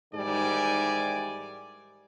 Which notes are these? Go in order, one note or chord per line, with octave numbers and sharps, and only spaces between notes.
G#2 D#3 E3 G3 D5 G#5